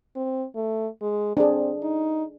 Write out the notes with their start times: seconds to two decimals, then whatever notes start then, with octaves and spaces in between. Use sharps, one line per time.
0.16 C4
0.55 A3
1.02 G#3
1.37 C4 D4 G#4
1.83 D#4